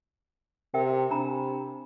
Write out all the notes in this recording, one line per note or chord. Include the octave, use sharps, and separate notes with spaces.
C3 A#4 E5 G5
C3 D4 A#5 B5